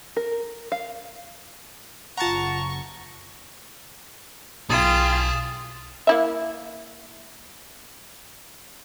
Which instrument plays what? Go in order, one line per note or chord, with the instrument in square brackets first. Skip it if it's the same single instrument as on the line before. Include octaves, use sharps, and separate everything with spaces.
[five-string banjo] A#4
F5
[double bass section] F#1 C#3 [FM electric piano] F4 F#5 [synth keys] A5 A#5 [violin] C#6
[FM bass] B1 [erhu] F4 [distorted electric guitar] G#4 G5 [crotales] D#6 A6 E7
[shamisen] A#3 E4 E5